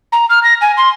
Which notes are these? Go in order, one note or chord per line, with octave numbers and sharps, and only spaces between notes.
A#5
F6
A#6
G#5
C6